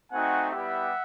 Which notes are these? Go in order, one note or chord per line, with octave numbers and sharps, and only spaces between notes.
A3 C4 D#4 F#4 F#5 G#5
G3 B3 E4 G4 E5 F#5